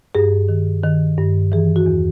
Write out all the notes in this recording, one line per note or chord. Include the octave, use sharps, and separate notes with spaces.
G2 G#4
D#3
D#3
G2
E3 G#4
F#4
E2